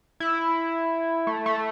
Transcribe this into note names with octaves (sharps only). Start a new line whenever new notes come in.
E4
A3
A3